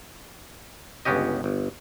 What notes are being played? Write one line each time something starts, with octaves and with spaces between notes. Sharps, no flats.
G1 C#2 B3 C#4 G4 D#5
G1